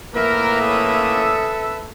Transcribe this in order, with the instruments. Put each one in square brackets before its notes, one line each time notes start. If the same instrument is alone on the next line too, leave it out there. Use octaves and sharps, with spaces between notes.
[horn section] A2 A#3 [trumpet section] A#4 [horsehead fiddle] B4 E5
[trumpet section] C#4 C#5 D#6 [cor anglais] A4